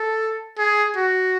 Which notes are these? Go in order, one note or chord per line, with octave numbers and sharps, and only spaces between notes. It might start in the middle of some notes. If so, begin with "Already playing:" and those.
Already playing: A4
G#4
F#4